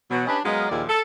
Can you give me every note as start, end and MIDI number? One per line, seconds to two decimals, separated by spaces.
0.11 0.26 47
0.11 0.26 52
0.11 0.26 54
0.26 0.38 61
0.26 0.38 62
0.26 0.38 67
0.26 0.38 71
0.26 0.38 73
0.26 0.38 75
0.45 0.65 54
0.45 0.65 56
0.45 0.65 59
0.45 0.65 70
0.45 0.65 75
0.45 0.65 77
0.69 0.83 39
0.69 0.83 46
0.69 0.83 53
0.69 0.83 64
0.69 0.83 68
0.69 0.83 74
0.89 1.00 69